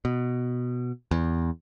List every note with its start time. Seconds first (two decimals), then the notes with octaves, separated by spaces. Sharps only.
0.05 B2
1.11 E2